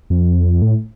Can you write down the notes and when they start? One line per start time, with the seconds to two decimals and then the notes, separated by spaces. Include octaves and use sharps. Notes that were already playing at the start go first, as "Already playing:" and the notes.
0.10 F2
0.62 A2